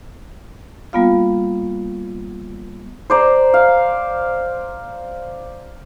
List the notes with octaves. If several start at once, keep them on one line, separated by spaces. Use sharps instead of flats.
G3 A#3 B3 F4 F5
C5 D5 A#5
F5